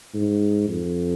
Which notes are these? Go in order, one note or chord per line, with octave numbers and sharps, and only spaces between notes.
G#2
F2